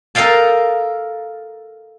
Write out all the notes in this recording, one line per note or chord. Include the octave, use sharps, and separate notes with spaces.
A4 A#4 D#5 F5 G5 A5